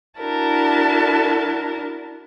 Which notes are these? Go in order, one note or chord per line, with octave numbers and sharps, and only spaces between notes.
D4 E4 F#4 A#4 A5